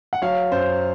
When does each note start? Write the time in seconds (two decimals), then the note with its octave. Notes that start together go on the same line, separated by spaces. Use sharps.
0.13 F#5
0.22 F#3 C#5 F5
0.52 F#2 C5